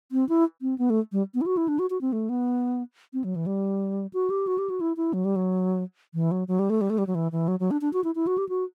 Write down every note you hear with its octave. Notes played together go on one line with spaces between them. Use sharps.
C4
E4
C4
B3
A3
G3
B3
E4
F#4
E4
D4
F#4
F#4
C4
A3
B3
C4
F#3
E3
G3
F#4
G4
F#4
G4
F#4
E4
E4
F#3
G3
F#3
E3
F#3
F#3
G3
A3
G3
A3
G3
F#3
E3
E3
F#3
F#3
D4
D4
F#4
E4
E4
F#4
G4
F#4